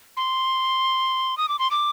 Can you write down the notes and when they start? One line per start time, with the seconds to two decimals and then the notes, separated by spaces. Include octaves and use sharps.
0.17 C6
1.38 D#6
1.49 D6
1.59 C6
1.71 D6